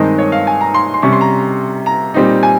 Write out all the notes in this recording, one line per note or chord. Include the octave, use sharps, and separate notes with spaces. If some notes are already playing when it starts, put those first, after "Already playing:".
Already playing: G2 D#3 G#3 C4 D#4 D#5
C#5
F5
G#5
A#5
C6
C6
C3 G3 C#4 C#6
C6
A#5
A#5
A#2 G3 C4 D#4
G#5